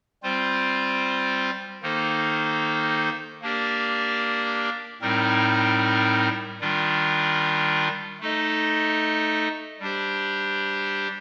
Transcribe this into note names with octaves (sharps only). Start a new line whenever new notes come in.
G3 C4 F4 C5
D#3 A#3 D#4 A4 C5
A#3 D4 G4 A#4 D5
A2 G3 C4 D#4 A#4
D#3 G3 D4 F4
A3 D#4 A4 D#5
G3 D4 G4 C5